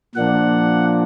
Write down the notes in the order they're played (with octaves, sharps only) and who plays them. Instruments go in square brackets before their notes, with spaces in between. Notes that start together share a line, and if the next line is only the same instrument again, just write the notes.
[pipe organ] A#2 F3 A#3 D4 F#5